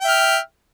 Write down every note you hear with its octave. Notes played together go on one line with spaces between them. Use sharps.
E5 G5 F6